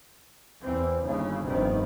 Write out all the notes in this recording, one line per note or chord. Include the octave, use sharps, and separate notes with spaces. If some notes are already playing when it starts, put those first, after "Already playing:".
E2 E3 C4
G1 D#2 C#3
F1 G2 C3 D#3 B3